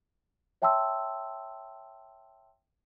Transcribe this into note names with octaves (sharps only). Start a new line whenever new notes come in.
C#5 E5 G5 A5 C6 E6